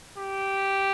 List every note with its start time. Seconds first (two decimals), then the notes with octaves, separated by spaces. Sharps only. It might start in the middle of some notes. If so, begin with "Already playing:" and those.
0.17 G4